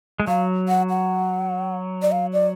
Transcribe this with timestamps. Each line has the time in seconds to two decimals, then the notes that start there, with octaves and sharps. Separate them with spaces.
0.20 G#3
0.27 F#3 F5
0.68 F#5
0.90 F#5
2.02 D5
2.12 F5
2.33 D5